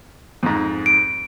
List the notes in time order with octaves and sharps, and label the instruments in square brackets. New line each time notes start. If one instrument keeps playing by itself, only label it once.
[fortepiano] F2 G#2
[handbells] D7